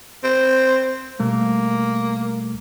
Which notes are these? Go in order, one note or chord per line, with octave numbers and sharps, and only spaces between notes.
C4
B2 G3 A3 A#3